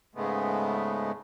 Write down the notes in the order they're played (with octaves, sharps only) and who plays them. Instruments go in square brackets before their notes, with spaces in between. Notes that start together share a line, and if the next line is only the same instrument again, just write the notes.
[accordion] G#2 C#3 G#3 A3 B3